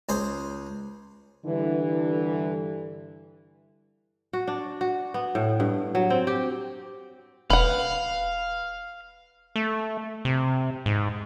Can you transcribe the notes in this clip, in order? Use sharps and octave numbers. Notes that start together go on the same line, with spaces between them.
C#2 G#4 C5
G2 D3 E3
F#4
D4
F#4
B3
A2
G2
F#3
C4
G4
E1 B4 F5 F#5
A3
C3
G#2